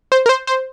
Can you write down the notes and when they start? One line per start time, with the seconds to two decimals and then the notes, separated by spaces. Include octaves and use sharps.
0.12 C5
0.26 A#4
0.29 C5
0.47 C5